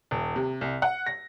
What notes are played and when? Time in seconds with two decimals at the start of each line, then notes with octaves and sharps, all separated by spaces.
0.11 D#1
0.36 C3
0.61 C2
0.82 F#5
1.07 A#6